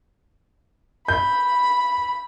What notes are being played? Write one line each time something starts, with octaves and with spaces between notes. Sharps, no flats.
B5 G6